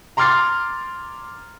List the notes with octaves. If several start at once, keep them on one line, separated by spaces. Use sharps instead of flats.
A#5 C6 D6 F6 A6 C7